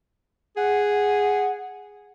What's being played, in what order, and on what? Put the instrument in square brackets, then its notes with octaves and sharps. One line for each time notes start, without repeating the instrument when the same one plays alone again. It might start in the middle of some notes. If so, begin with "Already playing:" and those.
[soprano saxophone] G#4 [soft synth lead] F#5